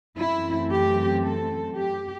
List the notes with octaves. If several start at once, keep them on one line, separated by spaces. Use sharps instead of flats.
F#2 E3 A3 C4 E4
G4
A4
G4